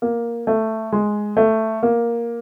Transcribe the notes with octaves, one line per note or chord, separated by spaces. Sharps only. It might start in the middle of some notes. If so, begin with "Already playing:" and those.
A#3
A3
G#3
A3
A#3